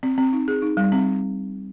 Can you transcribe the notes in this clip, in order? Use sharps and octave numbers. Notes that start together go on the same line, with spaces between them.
C4
C4
D#4
G#4
D#4
G3
C4